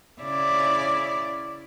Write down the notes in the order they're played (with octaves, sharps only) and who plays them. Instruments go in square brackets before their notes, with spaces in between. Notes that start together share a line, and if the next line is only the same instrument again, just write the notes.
[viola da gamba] C#3 E4 D5